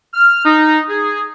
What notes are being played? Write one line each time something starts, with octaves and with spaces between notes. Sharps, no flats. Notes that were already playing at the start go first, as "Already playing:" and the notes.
F6
D#4
G#4